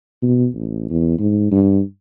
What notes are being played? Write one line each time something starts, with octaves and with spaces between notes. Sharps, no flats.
B2
A1
E2
G#2
G2